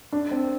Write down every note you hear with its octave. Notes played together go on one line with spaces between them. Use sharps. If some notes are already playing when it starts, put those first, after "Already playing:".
D4
C4